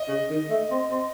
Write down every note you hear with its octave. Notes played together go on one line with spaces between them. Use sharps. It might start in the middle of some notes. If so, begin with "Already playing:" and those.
Already playing: D#5
C#3
D#3
A3
C4
C4